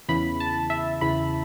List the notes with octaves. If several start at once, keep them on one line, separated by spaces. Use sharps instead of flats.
E2 C#3 E3 B5
A5
E5
E2 C#3 E3 B5